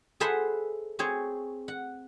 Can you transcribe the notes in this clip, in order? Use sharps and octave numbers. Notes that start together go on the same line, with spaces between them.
G#4 A4 B4 C5 E5 F#5
C4 G#4 C5 C#5
F#5